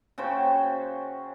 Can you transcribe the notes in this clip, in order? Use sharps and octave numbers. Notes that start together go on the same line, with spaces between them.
C#3 F#4 C5 G5